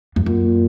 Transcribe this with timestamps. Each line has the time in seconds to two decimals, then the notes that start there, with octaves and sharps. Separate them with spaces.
0.16 F2
0.26 F#2 A#2